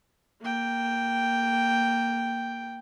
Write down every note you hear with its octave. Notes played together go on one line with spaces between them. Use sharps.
A#3 G5